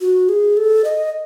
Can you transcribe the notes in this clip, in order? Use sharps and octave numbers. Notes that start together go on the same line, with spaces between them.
F#4
G#4
A4
D#5